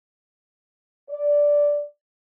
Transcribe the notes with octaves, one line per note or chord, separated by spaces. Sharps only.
D5